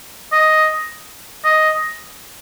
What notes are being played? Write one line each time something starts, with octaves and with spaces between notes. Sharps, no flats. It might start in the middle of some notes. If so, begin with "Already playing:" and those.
D#5
D#5